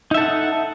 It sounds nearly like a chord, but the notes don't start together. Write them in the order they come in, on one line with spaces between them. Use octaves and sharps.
D#4 E5 A4 F#5